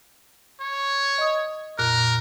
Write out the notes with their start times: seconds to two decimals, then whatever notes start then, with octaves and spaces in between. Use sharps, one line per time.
0.61 C#5
1.18 D#5 D#6
1.78 F2 A#2 A#4 F#6